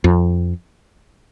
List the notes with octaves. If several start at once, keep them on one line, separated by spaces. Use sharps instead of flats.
F2